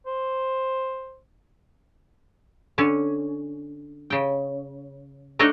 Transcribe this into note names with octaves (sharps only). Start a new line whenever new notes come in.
C5
D3 C#4
C#3 G5
A3 D4 D#4 C#5 D#5 F#5